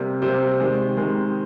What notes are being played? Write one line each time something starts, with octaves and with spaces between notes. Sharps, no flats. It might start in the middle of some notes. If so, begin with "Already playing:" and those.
Already playing: C3 G3 A#3
C3 G3 A#3 C5
C3 D#3 G#3
C3 D#3 G#3 A#4